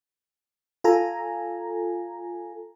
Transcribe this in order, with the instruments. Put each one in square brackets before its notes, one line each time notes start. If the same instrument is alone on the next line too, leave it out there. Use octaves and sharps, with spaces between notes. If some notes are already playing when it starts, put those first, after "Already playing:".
[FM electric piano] F4 A4 G#5 A#5